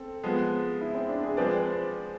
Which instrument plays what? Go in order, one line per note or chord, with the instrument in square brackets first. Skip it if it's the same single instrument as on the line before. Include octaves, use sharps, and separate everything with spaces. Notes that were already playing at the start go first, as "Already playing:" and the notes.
Already playing: [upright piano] C4 A4
[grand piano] F3 G#3 B3
[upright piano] E4
C4
D4
G#4
[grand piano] F3 G#3 C4 G#4 D5 [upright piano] B4
[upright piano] C5